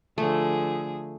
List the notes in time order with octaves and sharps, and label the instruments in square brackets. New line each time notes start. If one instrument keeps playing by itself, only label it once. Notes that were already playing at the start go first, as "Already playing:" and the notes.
[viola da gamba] D3 F3 G#4 [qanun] A3